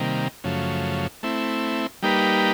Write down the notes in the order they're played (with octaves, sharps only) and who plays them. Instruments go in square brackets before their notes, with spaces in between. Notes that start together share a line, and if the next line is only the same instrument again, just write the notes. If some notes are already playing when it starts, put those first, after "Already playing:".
Already playing: [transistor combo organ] C3 D#3 G3 A#3
F#2 C#3 F3 A3
A3 C4 E4
G3 A#3 D#4 G4 B4